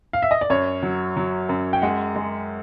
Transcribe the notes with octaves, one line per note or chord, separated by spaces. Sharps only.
F5
E5
D#5
D5
F#2 C#5
F#3
F#3
F#2
G5
G#3 F#5
G#3